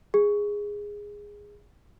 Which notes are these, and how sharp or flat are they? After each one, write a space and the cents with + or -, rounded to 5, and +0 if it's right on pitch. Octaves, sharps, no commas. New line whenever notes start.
G#4 -10